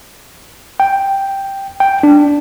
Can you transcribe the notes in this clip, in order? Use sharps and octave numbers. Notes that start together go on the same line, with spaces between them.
G5
G5
D4